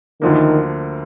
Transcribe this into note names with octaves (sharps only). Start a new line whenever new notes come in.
D2 D3 D#3 F3 A#3